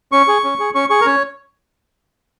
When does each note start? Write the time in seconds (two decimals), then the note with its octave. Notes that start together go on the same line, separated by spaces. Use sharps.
0.12 C#4 C#6
0.28 G#4
0.44 C#4
0.60 G#4
0.75 C#4 C#6
0.90 G#4 C#6
1.01 A#4
1.06 C#4 C#5